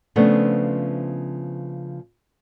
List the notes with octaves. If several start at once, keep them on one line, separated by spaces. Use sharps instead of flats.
C#3 F3 A3 B3 C4 D4